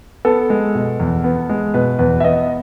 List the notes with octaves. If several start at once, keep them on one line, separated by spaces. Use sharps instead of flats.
B3 A4
G#3
B2
E2
B3
G#3
B2 B4
E2 B4
E5
B3 D#5